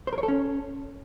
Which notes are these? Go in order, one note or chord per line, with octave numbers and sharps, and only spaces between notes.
C5
A#4
C#5
A4
C#4